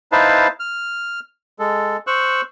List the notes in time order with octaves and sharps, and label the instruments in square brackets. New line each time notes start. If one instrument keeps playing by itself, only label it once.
[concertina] D#4 E4 B4 C5 F5 A5
F6
G#3 A4
C5 C#6 E6 F#6